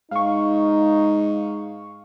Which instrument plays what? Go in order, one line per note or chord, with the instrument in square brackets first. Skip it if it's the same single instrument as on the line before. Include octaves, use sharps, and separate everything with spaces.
[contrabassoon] G#2 [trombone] D#4 [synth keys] F5 C#6